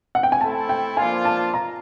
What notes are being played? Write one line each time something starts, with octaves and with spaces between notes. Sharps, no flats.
F#5
G5
G#5
A3 C4 E4 A4 A5
G5
F3 A#3 D4 F4 G#5
A5
A#5